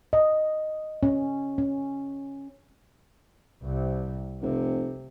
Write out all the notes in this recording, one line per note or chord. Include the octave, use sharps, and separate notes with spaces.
D#5
C#4
C#4
C2 C3
F1 C3